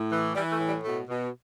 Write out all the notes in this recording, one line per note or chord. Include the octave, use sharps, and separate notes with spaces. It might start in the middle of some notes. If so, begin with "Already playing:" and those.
Already playing: A2
E3
E3 G3
A3
A2
G3
B2 A3
B2